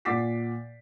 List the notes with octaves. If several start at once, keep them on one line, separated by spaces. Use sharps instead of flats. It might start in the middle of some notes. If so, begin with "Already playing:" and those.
A#2 F#5 D6 A6 B6 C7